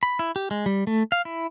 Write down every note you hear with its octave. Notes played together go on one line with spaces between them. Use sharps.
B5
E4
G4
G#3
G3
A3
F5
E4